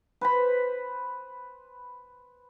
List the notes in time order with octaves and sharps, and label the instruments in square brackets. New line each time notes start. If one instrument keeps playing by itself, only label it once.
[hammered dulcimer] B4 C5 B5